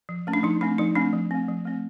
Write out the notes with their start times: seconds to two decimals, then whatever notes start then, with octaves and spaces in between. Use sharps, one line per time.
0.09 F3
0.27 A3 C#4
0.33 D4
0.43 F3 D#4
0.61 A3 C4 D4
0.78 F3 D#4
0.95 A3 C4 D4
1.13 F3
1.31 A3 C4
1.49 F3
1.65 A3 C4